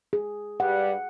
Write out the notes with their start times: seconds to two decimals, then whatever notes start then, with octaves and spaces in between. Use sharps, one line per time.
0.13 G#4
0.60 G2 G3 F#5